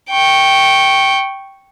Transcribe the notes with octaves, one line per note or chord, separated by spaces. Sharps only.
G5 C#6